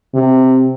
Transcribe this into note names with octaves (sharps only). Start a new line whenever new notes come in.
C3